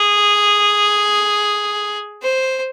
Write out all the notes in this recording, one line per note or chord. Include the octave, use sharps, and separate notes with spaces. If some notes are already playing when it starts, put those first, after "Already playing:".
Already playing: G#4
C5